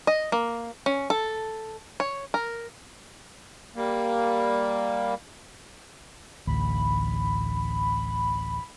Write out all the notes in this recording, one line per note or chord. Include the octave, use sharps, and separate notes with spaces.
D#5
A#3
C#4
A4
C#5
A#4
G3 A#3
A1 D2 B5